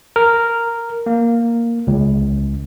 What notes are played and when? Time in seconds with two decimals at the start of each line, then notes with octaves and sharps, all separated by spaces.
0.16 A#4
1.06 A#3
1.87 C#2